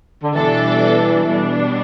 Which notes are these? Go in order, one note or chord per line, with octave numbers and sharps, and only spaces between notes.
D3
B2 E3 G3 D4 A4
B2 G3 D4